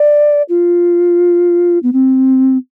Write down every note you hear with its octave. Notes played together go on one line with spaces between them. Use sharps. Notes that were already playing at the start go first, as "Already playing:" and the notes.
Already playing: D5
F4
B3
C4